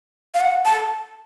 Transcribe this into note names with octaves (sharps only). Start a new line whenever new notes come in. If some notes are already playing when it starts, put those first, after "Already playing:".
F5
F#5
A5